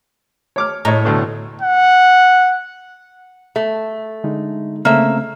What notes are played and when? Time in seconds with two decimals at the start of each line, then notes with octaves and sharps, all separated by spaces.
0.56 C#5 D6 F6
0.85 A2 C#5 D#5 A#5
1.05 D2 B2 A3
1.62 F#5
3.56 A3
4.24 D3 G#3 D#4
4.85 C#3 A3 A#3 C4 E5